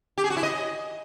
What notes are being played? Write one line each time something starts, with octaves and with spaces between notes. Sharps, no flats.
G4
G#4
F#4
E4
D#5